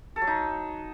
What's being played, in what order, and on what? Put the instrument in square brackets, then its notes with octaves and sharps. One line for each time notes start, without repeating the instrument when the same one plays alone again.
[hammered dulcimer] A4
F#3
D#4